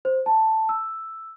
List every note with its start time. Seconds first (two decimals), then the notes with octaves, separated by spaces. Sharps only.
0.05 C5
0.26 A5
0.69 E6